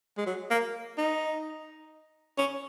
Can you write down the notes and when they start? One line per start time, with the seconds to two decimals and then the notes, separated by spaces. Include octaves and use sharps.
0.17 G#3
0.26 F#3
0.51 A#3
0.98 D#4
2.38 C#4